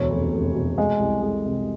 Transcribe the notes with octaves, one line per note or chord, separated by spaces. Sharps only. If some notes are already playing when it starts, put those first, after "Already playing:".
Already playing: E1 D2 B2 C#5
F1
F1
B2
G#3 D#5
C2
G#3
C3